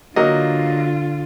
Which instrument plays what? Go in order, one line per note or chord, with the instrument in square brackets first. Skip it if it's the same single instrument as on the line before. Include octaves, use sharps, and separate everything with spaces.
[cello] D3 F4 [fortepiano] F#3 A#3 D#5